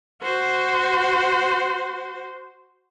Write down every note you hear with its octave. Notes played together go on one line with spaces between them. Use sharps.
F#4 C5